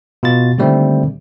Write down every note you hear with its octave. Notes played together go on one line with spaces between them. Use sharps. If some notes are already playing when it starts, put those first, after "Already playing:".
B2 F4 A6
A#2 D3 D#3 G3 A3 C4